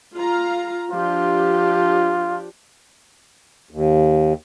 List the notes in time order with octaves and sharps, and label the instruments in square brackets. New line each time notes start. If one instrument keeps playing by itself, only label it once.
[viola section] F4 F5 A#5
[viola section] F3 D4 G4 [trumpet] F4
[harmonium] D#2